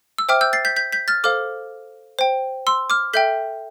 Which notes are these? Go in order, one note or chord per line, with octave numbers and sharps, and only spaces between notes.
E6
C5 E5 G5 D6 F6
E6 G6
A6 C7
G6 B6
G6 B6
G6 B6
F6 A6
A4 C5 F5 D6 F6
C5 G5
C6 E6
D6 F6
A4 E5 G5 G6 B6